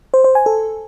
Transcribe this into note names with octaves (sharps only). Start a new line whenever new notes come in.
C5
C5
G#5
A4